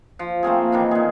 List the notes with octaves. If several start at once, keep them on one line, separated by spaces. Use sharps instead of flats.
F3
A3 A#3 C4 G#4
D#3 E3 A#3
A#2 G#4